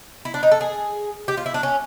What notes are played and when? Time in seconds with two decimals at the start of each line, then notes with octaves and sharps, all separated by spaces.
0.25 E4
0.34 D4
0.43 D#4
0.51 A4
0.61 G#4
1.28 G4
1.37 F4
1.46 E4
1.54 D4
1.63 C#4